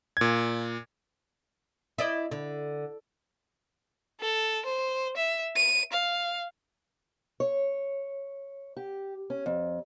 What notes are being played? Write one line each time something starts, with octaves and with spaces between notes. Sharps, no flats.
A#2 G#6
E4 D5 D#5
D3
A4
C5
E5
D#7
F5
C#5
G4
C#4
F2